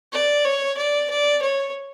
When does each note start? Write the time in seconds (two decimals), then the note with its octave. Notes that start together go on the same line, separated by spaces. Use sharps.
0.13 D5
0.45 C#5
0.78 D5
1.10 D5
1.42 C#5